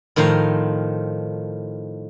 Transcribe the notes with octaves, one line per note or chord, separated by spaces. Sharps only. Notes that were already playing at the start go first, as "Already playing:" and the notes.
A2 D#3 F3 C5 A#5